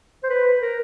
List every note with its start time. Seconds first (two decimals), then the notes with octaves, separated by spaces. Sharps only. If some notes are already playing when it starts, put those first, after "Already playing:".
0.23 C5
0.30 B4
0.61 A#4